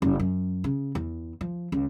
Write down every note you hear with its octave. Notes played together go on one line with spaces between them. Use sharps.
F#1
F#2
C#3
E2
F3
C#2